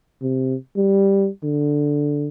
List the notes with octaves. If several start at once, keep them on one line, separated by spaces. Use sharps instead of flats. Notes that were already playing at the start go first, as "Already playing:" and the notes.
C3
G3
D3